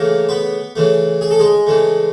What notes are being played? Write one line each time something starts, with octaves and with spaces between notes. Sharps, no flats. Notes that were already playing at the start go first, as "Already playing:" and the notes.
Already playing: C#3 E3 A3 A#3 A#4
B3 B4
C#3 E3 A3
G#4
A4
G#3 G#4
C#3 E3 A3